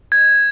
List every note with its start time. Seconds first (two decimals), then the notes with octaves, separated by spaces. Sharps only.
0.12 G#6